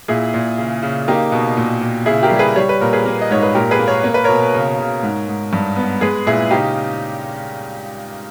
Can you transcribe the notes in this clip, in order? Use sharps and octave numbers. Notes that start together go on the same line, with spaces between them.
A#2 E4 G#4
A#2
C#3
C#3
A#3 D#4 G4
B2
A#2
A#2
C#3 E4 G#4
G4 A#4
G3
G#4 B4
G3 C#5
B4
A#2 A#4
G#4 B4
A#3
D#5
G#2 C#5
B4
A#2 G4 A#4
G#4 B4
A#3
A#4 C#5
A#3 C#5
B4
B2 A#4 C#5
C#3
C#3
G#2
G#2
G2
B3
G#3 G#4 B4
A#2 E4 G#4
C#3 D#4 G4